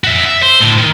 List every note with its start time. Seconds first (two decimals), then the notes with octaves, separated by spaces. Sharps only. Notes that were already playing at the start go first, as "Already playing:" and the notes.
0.04 F#4 E5
0.25 E5
0.43 C5
0.61 A2 D3
0.78 D#3